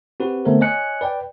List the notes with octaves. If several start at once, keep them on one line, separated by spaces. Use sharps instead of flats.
C4 F#4 G4 B4
D3 A3 B3 C4 A#4 C5
C#5 D#5 G#5 F#6 C#7
B4 D5 G5